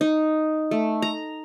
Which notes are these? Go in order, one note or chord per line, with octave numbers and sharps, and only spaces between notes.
D#4
A3
A#5